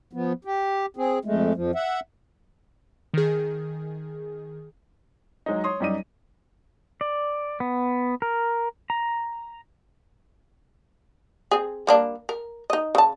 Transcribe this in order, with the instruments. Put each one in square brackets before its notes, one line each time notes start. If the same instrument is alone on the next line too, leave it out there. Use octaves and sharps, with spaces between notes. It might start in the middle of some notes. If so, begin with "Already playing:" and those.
[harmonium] F3 B3
G4
C4 G#4
F2 G#3 A3
F2 F3
E5 F#5
[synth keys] D#3 G#4
[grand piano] F#3 G#3 D#4
C#5 C6 D#6
F#2 G3 D#4 D#7
[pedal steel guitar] D5
B3
A#4
A#5
[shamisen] C4 G#4
G3 A#3 D4
A#4
D#4 D#5
C#3 A5